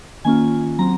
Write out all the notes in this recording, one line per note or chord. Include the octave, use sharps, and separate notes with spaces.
D#3 A#3 C#4 F4 G#5
F#3 C4 A#5